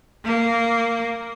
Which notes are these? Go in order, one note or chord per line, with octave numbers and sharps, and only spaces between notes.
A#3